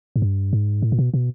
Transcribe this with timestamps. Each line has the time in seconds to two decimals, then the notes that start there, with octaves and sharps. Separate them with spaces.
0.16 G#2
0.22 G2
0.53 G#2
0.82 A2
0.92 A#2
0.99 B2
1.14 B2